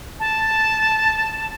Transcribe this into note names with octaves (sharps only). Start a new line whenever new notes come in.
A5